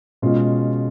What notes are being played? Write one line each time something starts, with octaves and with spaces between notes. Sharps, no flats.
B2 G#3 C#4 F4